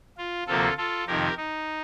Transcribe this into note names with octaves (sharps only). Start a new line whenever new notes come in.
F4
D2 C3 F3 A#3 F4 A4
F4 A4
F2 C3 D#3 G4 A#4
D#4